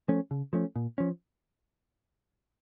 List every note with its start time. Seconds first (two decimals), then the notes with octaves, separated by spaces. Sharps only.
0.08 F3 A3 C#4
0.31 C#3
0.53 F3 A3 C#4
0.76 A#2
0.98 F3 C#4